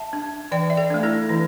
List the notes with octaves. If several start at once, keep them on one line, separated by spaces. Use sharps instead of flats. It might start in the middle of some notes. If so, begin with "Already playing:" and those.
Already playing: E5 A5
D4
E3 D5 G5
E5
A4 D5
A3 D4
E4 A4
E3 E4